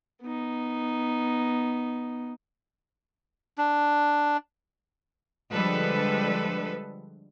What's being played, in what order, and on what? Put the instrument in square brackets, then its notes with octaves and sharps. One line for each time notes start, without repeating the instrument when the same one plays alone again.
[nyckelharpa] B3 D#4
[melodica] D4
[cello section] D3 F3 G3 G#3 A4 B4